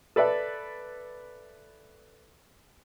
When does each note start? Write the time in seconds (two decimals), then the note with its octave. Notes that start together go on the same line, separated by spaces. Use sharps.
0.16 A4 B4 D5 E5